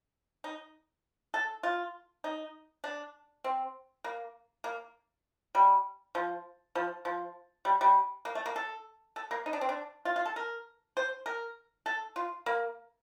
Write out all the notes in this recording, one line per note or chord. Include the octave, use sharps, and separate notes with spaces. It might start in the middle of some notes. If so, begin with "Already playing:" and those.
D#4
A4
F4
D#4
D4
C4
A#3
A#3
G3
F3
F3
F3
G3
G3
A#3
A3
A#3
A4
A4
A#3
D#4
D4
C4
D4
F4
F4
A4
A#4
C5
A#4
A4
F4
A#3